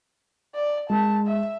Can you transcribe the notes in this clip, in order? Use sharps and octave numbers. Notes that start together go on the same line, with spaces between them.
D5
G#3 A5
E5